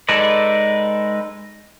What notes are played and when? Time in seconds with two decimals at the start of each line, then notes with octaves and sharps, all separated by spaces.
0.09 G#3 D#4 A4 B4 D5